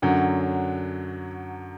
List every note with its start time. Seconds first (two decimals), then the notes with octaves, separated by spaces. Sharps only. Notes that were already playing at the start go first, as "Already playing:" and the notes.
0.02 F#2 D3 F#3